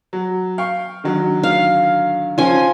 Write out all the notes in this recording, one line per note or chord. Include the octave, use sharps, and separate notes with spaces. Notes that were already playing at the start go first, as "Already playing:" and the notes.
F#3
F5 G5 C#6
D3 D#3 F#3
F5
F3 C#4 G#5